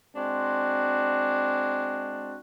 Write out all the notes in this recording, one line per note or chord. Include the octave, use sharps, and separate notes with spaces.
G#3 C4 D4 F#4